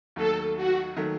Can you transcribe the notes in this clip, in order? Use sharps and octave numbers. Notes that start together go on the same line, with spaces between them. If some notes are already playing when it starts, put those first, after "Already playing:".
D#2 D#3 F#3 A3 A4
F#4
D#3 F#3 A3